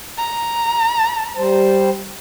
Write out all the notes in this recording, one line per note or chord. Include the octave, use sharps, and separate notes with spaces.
A#5
G3 C5